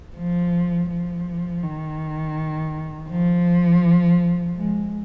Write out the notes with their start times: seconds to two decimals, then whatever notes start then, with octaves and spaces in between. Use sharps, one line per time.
0.16 F3
0.89 F3
1.63 D#3
3.09 F3
4.56 G#3